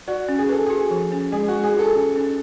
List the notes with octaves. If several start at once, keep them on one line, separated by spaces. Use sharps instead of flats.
F#4 D5
C#4
G#4
A4 B4
F#4 G#4
F3
C#4
G#3 G#4
G#3 F#4
G#4
F4 A4
C#4
C#4